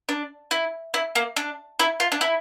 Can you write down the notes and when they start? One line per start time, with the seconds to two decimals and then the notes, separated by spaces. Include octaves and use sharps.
0.09 D4
0.51 E4
0.94 E4
1.15 A#3
1.36 D4
1.79 E4
2.00 F4
2.12 D4
2.21 E4